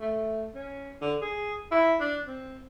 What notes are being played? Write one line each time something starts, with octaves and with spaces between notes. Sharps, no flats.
A3
C#4
D3
G#4
E4
D4
C4